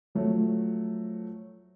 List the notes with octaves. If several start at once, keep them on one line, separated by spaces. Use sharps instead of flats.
F3 F#3 A3